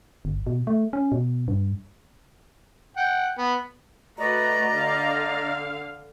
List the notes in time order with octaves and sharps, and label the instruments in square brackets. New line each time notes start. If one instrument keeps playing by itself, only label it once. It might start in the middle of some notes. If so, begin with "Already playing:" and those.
[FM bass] G1
B2
A3
C#4
B2
G2
[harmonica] F#5 G5
B3
[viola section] A3 F#4 B4 [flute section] D5 D#5 A#5
[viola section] D3 F5